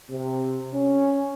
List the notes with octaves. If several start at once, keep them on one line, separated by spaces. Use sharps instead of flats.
C3
C#4